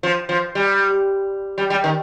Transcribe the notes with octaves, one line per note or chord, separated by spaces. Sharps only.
F3
F3
G3
G3
G3
D#3